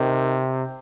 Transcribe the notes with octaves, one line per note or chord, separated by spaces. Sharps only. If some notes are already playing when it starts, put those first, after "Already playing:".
Already playing: C3 D#3